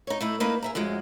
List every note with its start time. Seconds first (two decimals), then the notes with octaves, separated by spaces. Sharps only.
0.07 D#4 C#5
0.21 A3 D#4 E4
0.40 A#3 C#4 D#4 E4 B4
0.63 G#4 E5 A#5
0.75 F#2 F3 F#3 G#3